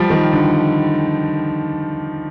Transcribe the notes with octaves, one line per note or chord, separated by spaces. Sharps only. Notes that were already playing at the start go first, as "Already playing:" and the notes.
Already playing: F3 G3
D#3
D3